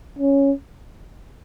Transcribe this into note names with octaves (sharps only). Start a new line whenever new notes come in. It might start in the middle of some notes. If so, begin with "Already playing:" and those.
C#4